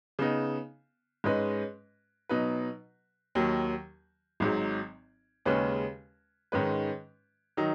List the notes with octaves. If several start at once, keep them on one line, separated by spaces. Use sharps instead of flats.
C#3 B3 D#4
G#2 G#3 C#4 B4 D#5
B2 F#3 D#4 B4
D#2 D#3 F#3
G#1 G#2 F#3
D#2 C#3 G#3 C#4 B4
G#2 D#3 G#3 C#4 B4
D#3 F#3 D#4